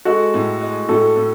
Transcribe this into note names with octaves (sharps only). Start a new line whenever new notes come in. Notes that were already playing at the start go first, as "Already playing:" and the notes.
G#3 F#4 A4
A2
G#3
A2 F#4 A4
A2